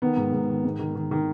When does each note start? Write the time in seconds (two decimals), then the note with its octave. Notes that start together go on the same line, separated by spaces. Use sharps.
0.02 D#3 B3
0.17 G#2
0.33 G#2
0.49 D#3
0.65 G#2
0.79 D#3
0.95 D#3
1.11 D#3